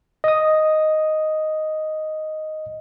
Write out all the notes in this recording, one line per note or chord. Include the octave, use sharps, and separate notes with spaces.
D#5 D#6